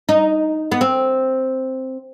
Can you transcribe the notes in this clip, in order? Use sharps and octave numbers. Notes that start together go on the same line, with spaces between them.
D#4
B3
C4